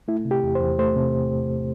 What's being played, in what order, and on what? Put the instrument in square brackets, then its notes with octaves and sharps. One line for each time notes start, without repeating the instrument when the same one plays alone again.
[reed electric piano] A3 E4
C3
G4
E2
C5
E2
A3 C5
C3